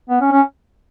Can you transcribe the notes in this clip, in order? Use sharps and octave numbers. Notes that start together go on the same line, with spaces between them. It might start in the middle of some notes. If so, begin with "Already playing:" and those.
B3
C#4
C#4